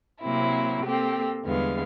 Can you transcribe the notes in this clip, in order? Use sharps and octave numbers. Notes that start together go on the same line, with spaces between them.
C3 F#3 A#3 C4 E4
A#3 C4 G4 A4
E2 D3 G3 G#3 B3 F5